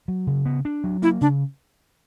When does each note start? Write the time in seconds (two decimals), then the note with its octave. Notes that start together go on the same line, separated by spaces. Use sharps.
0.08 F#3
0.27 C#3
0.46 B3
0.65 D4
0.84 F#3
1.02 A#3 E4
1.21 C#3 D4